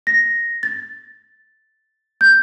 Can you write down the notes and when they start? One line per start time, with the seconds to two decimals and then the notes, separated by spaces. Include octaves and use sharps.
0.07 A#6
0.63 A6
2.21 G6